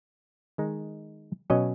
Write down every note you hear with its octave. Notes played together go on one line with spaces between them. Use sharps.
D#3 G#3 D#4
B2 F#3 C#4 D#5